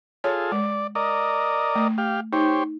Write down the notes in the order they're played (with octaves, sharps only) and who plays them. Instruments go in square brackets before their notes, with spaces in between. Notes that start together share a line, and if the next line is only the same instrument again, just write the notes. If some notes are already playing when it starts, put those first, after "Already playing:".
[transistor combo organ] F4 G#4 A4 [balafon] C#5
[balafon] G#3 [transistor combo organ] D5
[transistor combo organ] A#4 D5 D#5
[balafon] A3
[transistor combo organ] G4 F5
[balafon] D#4 [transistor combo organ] G4 C5 C#5